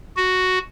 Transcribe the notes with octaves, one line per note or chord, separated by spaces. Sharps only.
F#4